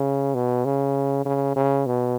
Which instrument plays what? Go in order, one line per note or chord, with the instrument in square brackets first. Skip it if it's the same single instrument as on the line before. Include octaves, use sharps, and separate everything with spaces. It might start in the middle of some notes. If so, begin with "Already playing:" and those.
Already playing: [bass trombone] C#3
B2
C#3
C#3
C#3
B2